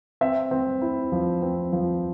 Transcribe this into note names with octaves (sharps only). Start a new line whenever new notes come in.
C4 E5
C4
E4
F3
C4
F3